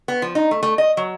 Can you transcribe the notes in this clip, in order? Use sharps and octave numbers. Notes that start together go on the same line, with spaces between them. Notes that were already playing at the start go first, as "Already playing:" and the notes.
B3
F3
D#4
A3
A3
D#5
F#3